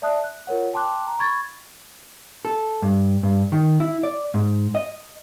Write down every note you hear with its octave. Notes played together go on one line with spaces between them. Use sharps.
D5 E5 A5 D#6 F#6
F#6
F4 A#4 C#5 F#5
G5 A5 C6 D6 F#6
A#5
B5 C#6 G#6 A6
A4
G2
G2
D#3
E4
D5
G#2
D#5